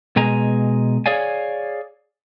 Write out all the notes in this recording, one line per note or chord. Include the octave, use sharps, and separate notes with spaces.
B2 G#3 G#5 A#5
G#4 C#5 D5 F5 G#5